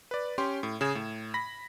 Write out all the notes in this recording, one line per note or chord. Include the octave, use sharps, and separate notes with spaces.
B4 D5
C#4 G4 G5 C6
A2
C#3 G#4 D#6 G#6 E7
A2
B5 A#6 B6